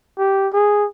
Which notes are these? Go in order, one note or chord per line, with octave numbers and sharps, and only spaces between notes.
G4
G#4